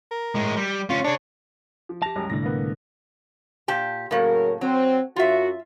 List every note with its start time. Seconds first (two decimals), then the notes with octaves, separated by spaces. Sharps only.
0.11 A#4
0.35 A2 G#3
0.57 G3
0.90 D2 C#4 F4
1.04 D4 G#4 C#5
1.89 F3
2.02 G4 A5 A#6 F7
2.16 C2 F#2 G#3
2.30 C2 A2 D3 A#6
2.43 A#3 B3
3.68 A#2 G4 A5
4.11 A2 C#3 F#3 A#3 A#4
4.61 F#3 C4
5.16 F#2 F4 F#4 E5